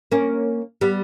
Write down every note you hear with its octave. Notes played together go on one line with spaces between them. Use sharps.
A#3 C#4
G3 B3